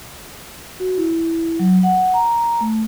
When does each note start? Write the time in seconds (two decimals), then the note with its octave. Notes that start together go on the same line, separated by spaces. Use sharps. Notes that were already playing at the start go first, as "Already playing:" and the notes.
0.80 F#4
0.98 E4
1.59 F#3
1.83 F#5
2.14 A#5
2.61 A3